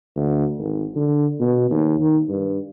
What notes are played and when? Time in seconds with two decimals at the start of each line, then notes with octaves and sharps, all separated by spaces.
0.16 D2
0.58 G#1
0.96 D3
1.40 B2
1.71 D#2
2.00 D#3
2.29 G2